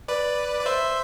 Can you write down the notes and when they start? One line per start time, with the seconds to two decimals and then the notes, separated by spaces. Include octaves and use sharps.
0.08 B4 D5
0.60 D5
0.66 C5 E5